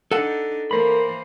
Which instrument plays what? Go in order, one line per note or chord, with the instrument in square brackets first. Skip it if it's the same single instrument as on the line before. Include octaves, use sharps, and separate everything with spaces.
[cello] D4 D#4 [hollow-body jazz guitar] A4 F#5
[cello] E3 A#3 [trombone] A#4 [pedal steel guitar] C5 B5